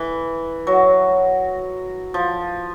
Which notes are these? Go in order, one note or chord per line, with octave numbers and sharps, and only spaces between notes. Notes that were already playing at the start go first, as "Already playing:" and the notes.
Already playing: E3
F#3
F3